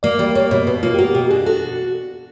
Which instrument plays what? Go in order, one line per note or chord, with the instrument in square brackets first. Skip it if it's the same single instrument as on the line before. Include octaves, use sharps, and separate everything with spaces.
[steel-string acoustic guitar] A#3 [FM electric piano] D5
[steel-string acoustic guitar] G3 [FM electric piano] D5
[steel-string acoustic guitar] A#3 [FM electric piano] C#5
[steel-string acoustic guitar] B2 [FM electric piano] C#5
[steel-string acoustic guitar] B2 [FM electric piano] B4
[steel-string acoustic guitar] A#3 [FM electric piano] F4
[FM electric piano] G4
[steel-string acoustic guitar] A#3 [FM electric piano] F#4
[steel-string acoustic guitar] B2 [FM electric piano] G4
[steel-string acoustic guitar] D4 [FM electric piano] G#4
[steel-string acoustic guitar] F#4 [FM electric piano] A4